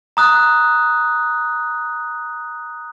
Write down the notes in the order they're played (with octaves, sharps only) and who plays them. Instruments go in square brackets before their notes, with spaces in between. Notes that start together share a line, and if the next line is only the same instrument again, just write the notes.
[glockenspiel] A#5 D#6 F#6